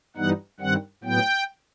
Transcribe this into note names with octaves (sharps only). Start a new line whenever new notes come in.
G2 E3 G3 B3 D#4 F#5
G2 D#3 G3 C4 F#5
A2 F#3 B3 G5